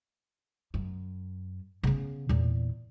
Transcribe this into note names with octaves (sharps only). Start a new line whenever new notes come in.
F#2
C#3 B3
E2 A#2